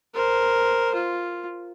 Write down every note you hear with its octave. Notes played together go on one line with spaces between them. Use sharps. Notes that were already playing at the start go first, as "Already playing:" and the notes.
A#4 C5
F4